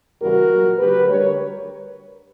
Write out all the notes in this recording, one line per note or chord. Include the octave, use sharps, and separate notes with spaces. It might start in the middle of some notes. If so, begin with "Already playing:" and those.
E2 C#3 E3 G3 F#4 A#4
A#2 F#3
D2 C#3 F#3 G4 B4
D2 D3 G3 A#4 C#5